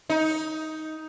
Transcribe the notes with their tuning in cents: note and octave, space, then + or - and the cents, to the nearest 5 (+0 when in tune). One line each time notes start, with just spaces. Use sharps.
D#4 +10